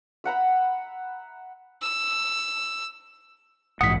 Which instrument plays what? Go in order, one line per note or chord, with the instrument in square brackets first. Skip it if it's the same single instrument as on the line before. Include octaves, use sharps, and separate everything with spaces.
[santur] E5 F#5 A#5 B5
[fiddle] E6
[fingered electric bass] A#1 G#2 E3 [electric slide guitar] F#5 [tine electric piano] D#6 B6